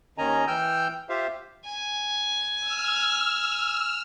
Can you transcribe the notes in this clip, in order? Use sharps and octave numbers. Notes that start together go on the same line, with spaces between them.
D#2 D#3 C#4 D#5 G#5 A#5
E3 G5 E6 F6 G6
F4 G4 C5 E5 F5
G#5
E6 F6